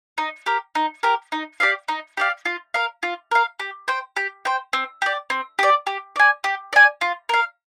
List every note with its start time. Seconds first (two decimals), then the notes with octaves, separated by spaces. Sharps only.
0.18 D#4
0.46 G4 A#4
0.75 D#4
1.03 G4 A#4
1.32 D#4
1.60 G4 D5 F5
1.88 D#4
2.17 G4 D5 F5
2.45 F4
2.74 A#4 F5
3.03 F4
3.31 A#4 F5
3.60 G4
3.88 C5 G5
4.16 G4
4.45 C5 G5
4.73 C4
5.02 G4 D5
5.30 C4
5.59 G4 D5
5.87 G4
6.16 D5 G#5
6.44 G4
6.73 D5 G#5
7.01 F4
7.29 A#4 F5